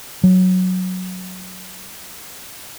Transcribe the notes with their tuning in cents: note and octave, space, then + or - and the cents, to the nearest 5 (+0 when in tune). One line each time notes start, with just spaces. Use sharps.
F#3 -5